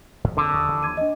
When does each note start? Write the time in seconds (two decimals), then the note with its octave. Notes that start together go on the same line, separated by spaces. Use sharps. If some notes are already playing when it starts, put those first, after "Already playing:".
0.24 G#2 F3
0.37 E2 D3 C4
0.54 D#2 C#6 D#6
0.68 D#2 E3 F3
0.83 D6 G#6 D#7
0.97 D4 D#5